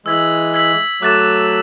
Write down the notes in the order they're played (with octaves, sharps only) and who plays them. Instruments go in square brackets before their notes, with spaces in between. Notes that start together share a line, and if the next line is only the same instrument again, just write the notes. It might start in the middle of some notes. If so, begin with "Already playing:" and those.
[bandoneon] E3 G#3 [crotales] E6 G#6 B6 F#7
[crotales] E6 G#6 B6 F#7
[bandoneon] F#3 A3 [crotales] D6 F#6 A6 E7